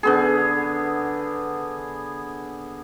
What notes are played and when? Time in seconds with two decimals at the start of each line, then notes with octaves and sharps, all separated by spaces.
0.03 D3 B3 G#4